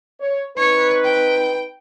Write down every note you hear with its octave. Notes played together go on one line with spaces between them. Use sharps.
C#5
C4 D#4 B4 C#5
G5